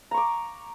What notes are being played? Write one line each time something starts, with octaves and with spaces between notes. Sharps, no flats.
A#5 C#6 D6